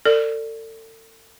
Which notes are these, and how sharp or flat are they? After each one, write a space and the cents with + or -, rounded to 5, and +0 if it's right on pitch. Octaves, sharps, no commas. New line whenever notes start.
A4 +35 D5 +0